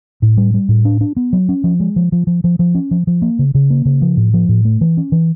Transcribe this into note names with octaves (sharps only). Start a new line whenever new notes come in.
A2
G3
G3
A2
D4
D4
B3
F#3
C#4
F3
G#3
F3
F3
F3
F3
F3
C#4
F3
F3
A#3
C#3
C#3
A#3
C#3
F3
A2
F3
A2
A3
E3
C#4
E3